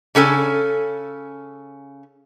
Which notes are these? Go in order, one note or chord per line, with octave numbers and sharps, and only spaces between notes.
C#3 C#4 A4 G#5